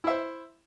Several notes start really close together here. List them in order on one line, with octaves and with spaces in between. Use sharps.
E4 E5 C5